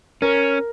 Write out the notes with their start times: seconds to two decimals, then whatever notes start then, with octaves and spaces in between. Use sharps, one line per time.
0.22 C#4 A#4